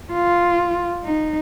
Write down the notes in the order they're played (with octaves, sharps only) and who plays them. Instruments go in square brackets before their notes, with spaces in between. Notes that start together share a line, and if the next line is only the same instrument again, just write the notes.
[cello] F4
D#4